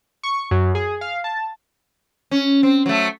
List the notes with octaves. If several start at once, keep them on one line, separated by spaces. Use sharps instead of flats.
C#6
F#2
G#4
F5
A5
C#4
C4
F#3 A3